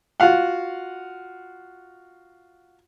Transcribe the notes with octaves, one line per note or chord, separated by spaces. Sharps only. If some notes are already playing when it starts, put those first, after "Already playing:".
F4 F#4 F5 F#5